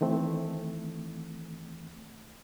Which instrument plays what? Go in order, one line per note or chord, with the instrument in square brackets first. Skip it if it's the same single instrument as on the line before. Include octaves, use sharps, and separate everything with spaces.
[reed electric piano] D#3 E3 A3 C4